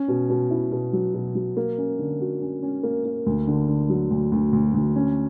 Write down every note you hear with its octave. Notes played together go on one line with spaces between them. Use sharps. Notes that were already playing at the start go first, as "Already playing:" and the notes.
Already playing: C#4
B2
B2
E4
B2
F#3
B2
F#3
A#3
C#4
D3
F#4
C#4
C#4
A#3
A#3
D2
D3
D3
F#3
D2
D2
D2
D2
C#4